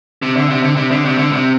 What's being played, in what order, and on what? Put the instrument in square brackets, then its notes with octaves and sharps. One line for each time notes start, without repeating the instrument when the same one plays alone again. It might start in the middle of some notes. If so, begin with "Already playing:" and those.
[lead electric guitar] C3
D3
C3
D3
C3
D3
C3
D3
C3